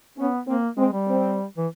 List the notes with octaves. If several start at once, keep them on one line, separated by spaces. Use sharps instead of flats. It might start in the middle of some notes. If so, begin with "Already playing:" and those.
B3 C#4
A#3 C4
G#3 C4
G3
C4
E3